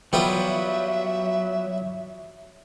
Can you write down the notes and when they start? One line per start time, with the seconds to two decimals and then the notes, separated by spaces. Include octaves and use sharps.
0.13 F#3 G3 B3 F4 E5